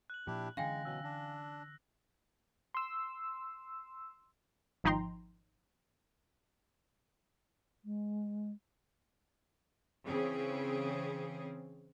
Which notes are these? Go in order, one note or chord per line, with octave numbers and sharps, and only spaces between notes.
F#6 F#7
A#2 F3 A#3 D4 E4 G4
D3 E3 G#3 C#4 F5 G5 G#5 A#6
B2 F#3 E6 F#6
D4 A#6
C6 E6
G#1 F3 D#4 G5 A#5 C6
G#3
C#3 E3 C4 G#4